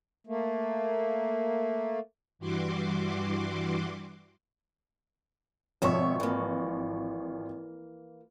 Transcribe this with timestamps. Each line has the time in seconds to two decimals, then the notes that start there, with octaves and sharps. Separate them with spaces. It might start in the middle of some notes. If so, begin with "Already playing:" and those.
0.27 A3 A#3
2.39 G2 E3 G3 F#4 C6 D6
5.82 G#1 B2 F3 C#5 E5 C#6
6.20 E3 A#3